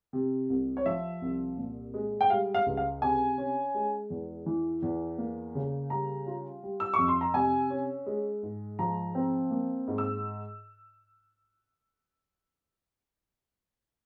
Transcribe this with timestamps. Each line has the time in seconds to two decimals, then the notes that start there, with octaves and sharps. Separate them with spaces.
0.13 C3
0.50 C2
0.77 C#5
0.86 F3 E5
1.22 C2
1.58 A#2
1.94 G#3
2.21 G5
2.30 G3 F5
2.54 F5
2.66 C#2
2.77 F5
3.02 C3 G#5
3.38 C#4
3.74 G#3
4.10 E2
4.46 E3
4.82 E2
5.18 A#3
5.55 C#3
5.90 G3 A#5
6.27 F4
6.63 G3
6.80 E6
6.94 C#6
6.99 F2
7.08 C6
7.21 A#5
7.34 C3 G#5
7.70 C#4
8.06 G#3
8.43 G#2
8.79 F3 A#5
9.15 C4
9.51 A#3
9.88 G#2
9.98 E6